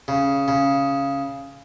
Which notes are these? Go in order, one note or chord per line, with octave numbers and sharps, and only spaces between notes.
C#3
C#3